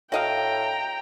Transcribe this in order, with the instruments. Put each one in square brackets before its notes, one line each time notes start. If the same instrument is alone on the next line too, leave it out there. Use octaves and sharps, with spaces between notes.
[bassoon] A2 [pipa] F#4 D#5 F5 [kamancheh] G5 A#5